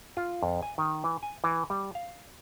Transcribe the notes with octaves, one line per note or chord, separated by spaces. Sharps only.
F4
F2
G#5
D#3
E3
G#5
E3
G3
F5